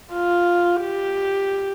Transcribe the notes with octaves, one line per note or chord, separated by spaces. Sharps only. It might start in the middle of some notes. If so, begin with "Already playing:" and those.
F4
G4